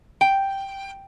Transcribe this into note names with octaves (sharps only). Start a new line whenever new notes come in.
G5